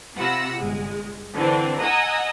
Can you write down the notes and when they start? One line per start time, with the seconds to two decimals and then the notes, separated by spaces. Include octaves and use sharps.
0.16 C3 F4 F#5 B5 E6 A#6
0.58 G1 G#3
1.34 D3 E3 C4 D4
1.81 D#5 F#5 G#5 A#5 D#6 E6